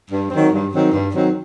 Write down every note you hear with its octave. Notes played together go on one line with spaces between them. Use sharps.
G2
D#3 F#3 C4
G2
D#3 F#3 C4
G2
D#3 F#3 C4